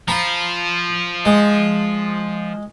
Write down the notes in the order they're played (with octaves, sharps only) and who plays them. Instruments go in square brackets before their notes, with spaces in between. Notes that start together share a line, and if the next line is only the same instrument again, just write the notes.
[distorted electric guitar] F3 F4 [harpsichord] A#5 B5
[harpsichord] G#3